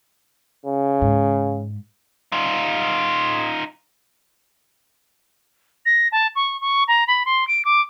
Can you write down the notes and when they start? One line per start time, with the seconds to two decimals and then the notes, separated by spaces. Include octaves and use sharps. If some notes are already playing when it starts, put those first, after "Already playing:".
0.65 C#3
1.02 G#2
2.32 D#4 F4
5.86 A#6
6.12 A5
6.36 C#6
6.61 C#6
6.88 A#5
7.08 B5
7.26 C6
7.48 D7
7.65 D6